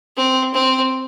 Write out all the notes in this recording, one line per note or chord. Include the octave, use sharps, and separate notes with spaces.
C4
C4